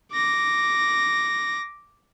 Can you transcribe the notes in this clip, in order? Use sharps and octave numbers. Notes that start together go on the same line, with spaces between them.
D6 A#6